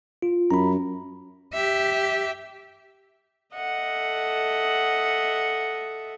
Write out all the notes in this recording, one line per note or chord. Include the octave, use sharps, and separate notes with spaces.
F4
F#2 A#5 B5
G4 E5
A4 D#5 E5 F#5